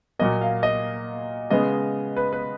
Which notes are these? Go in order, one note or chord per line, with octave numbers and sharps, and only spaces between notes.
A#2 F#3 A#3 D#5
F5
D#5
C#3 G#3 B3 D#5
B4
B4